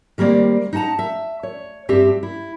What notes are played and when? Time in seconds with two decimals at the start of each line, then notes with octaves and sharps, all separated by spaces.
0.18 D#3 G3 A#3 C4 D5
0.73 D#4 D#5 F#5 A5 A#5
0.99 E5
1.43 C#5
1.89 G2 C4 G4 E5
2.23 E4